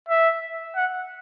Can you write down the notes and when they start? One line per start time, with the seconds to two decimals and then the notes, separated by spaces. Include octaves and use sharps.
0.09 E5
0.76 F#5